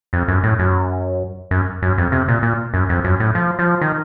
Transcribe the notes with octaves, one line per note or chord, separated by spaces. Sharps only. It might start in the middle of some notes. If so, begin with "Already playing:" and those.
F2
F#2
A2
F#2
F#2
F#2
F2
C3
A#2
A#2
F#2
F2
F#2
A2
F3
F3
D#3